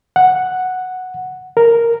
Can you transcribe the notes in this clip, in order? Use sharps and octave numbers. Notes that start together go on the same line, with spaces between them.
F#5
A#4